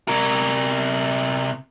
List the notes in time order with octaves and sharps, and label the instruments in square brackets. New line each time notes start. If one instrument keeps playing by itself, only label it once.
[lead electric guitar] C3 A#4